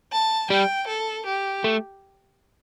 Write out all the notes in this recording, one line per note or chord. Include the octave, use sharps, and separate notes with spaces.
A5
G3 G5
A4
G4
A3